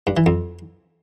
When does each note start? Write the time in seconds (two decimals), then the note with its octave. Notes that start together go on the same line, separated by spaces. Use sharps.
0.07 G2
0.17 E3
0.26 F2